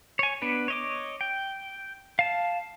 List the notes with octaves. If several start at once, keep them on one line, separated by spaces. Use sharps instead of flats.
C#5 G#5
B3 D4 B4
C#5 D#5 D6
G5
F5 A5